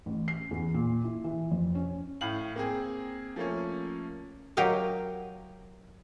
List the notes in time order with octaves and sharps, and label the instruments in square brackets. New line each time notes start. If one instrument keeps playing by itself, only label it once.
[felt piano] A1
C7
E2
A#2
E4
E3
F2
C#4
[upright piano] A2 F5 F#7
A#3 C4 G#4
F3 A3 A#3 C#4
[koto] F#3 G4 A#4 D#5 F5